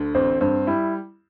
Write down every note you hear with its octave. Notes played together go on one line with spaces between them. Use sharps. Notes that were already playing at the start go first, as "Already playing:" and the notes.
Already playing: D2 D3
A1 C4
G2 C4
G3 E4